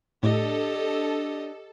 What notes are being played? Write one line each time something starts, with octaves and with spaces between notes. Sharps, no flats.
A2 D4 G4 A4 D#5